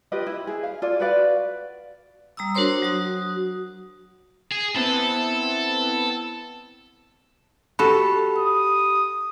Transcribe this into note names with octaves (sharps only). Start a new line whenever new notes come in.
F4 G4 B4 D#5
E4
G#4
F5
F4 A4 D5
F#4 B4 D5 F5
G3 A#5 D#6 E6
D4 F#4 A#4 C5 C#5 C6
F#3 F#4 D#6
G#4
B3 C4 E4 A4
F#4 G4 A4 B5
D#6